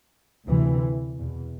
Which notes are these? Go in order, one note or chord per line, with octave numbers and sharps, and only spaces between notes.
D2 C3 E3
E2 B2